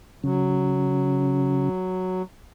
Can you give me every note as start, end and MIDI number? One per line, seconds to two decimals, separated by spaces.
0.24 1.69 49
0.24 2.22 54